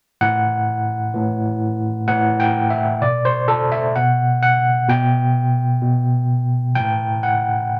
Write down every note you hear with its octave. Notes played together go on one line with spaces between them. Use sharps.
A2 E3 F#5
A2 E3
A2 E3 F#5
G5
E5
B2 D5
C5
A4
E5
B2 F#5
F#5
B2 G5
B2
A2 E3 G5
F#5